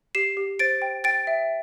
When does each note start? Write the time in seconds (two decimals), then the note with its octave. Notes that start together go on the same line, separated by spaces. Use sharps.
0.15 G4 C7 E7
0.37 G4
0.59 C5 A6 D7
0.82 G5
1.04 G5 A6 D7
1.27 E5